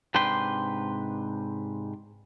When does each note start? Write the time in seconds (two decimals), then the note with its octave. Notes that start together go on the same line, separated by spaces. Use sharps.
0.15 G#2 C3 D4 B4 G5 C6